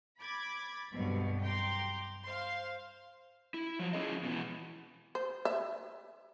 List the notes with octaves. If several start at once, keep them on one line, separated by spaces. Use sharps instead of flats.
B5 D6 G#6 A6
C2 G2 B2 D3 F#3
G5 A#5 C6 D6
C5 F5 C6
E4
F3 F#3
F2 F3 C#4 G#4 D#5
B2 E3
C5
E5